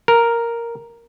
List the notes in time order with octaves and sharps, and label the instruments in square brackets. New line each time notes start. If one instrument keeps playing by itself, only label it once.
[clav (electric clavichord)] A#4